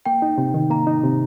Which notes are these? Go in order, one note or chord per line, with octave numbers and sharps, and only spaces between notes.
A#3 G5
D#4
C3
D#3
A#3 A#5
D#4
C3